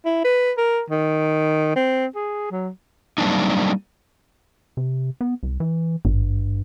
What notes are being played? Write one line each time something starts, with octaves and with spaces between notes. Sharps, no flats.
E4
B4
A#4
D#3
C4
G#4
F#3
F#3 G3 A#3 C4 D4 D#4
C3
B3
C2
E3
G#1 G2